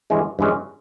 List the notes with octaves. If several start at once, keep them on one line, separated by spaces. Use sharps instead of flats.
G2 E3 G#3 C#4
G2 E3 G#3 C#4